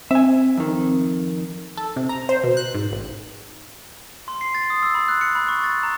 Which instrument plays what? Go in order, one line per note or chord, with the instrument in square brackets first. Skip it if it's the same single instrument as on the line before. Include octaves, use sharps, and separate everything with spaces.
[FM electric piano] C4 [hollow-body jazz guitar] E5 G#5
[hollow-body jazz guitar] F2 D#3
[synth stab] A4
C3
A#5
C5
B2
F#6
G#2
A1
[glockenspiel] C6
C7
A6
D#6
E6
B5
F#6
C#7
B5
C#6
A6
A#5